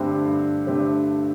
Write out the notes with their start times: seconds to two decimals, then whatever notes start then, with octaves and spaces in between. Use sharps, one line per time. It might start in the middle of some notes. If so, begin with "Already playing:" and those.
Already playing: G2 D3 A3 C4 G4
0.25 G2
0.67 D3 A3 C4 G4